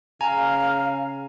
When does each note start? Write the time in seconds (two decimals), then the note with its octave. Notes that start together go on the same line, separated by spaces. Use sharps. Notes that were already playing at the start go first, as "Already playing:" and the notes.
0.21 C#3 F5 G#5 A#5